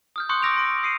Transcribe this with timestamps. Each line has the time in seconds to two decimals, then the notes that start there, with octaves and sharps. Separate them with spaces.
0.16 D#6 F6 G6
0.29 C6 C#6 D#6 F#6 G6 C#7
0.42 D6 E6 A#6 D7 F7
0.56 C6 A#6 D7
0.83 D#6 C7 C#7 D#7